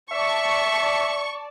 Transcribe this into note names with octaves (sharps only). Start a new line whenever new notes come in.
D5 E5 A5 C#6